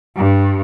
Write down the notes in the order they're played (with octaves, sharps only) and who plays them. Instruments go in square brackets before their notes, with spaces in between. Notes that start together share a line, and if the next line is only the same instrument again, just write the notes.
[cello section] G2